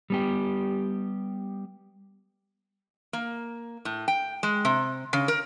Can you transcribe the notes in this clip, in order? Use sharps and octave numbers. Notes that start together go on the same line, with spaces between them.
G3 B3 G4
A#3
A2
G5
G#3
C3
C#3
A#4